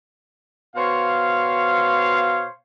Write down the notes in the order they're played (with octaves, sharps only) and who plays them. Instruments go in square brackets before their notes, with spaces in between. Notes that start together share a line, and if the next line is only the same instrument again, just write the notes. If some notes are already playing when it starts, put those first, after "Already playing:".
[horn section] B2 C5 C#5 F5